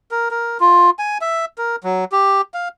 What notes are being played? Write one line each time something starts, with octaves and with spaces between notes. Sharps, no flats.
A#4
A#4
F4
G#5
E5
A#4
F#3
G4
F5